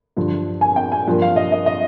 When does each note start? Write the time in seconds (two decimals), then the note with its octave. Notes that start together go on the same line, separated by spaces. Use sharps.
0.17 G2 D3 F3
0.61 G#5
0.76 G5
0.92 G#5
1.07 G2 F3 A#3
1.22 F5
1.36 D#5
1.52 D#5
1.66 D#5